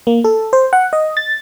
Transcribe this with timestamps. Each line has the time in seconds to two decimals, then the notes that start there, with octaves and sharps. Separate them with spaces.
0.07 A#3
0.24 A4
0.53 C5
0.73 F#5
0.93 D#5
1.17 A6